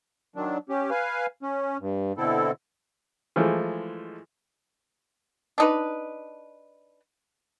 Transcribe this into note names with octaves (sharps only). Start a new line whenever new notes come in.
D#3 F#3 D4
C#4 G4
B4 F5 G#5
C#4
G2
B2 D3 C4 E4 A4
E3 F3 G#3 A3
D4 D#4 B4